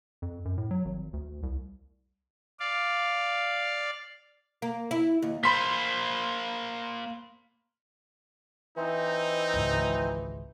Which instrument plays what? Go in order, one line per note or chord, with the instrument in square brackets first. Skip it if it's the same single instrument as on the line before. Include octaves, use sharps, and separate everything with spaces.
[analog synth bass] F2
F#2
A2
F#3
G#1
D2
C2
[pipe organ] D5 F5
[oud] A#3
E4
D#2
[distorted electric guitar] A#3 C5 [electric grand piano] B5 C6 B6
[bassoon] E3 [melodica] C4 E4 C5 [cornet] D#4
[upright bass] G#1 C#2